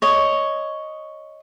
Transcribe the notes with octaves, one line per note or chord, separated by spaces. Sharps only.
C#5 D#5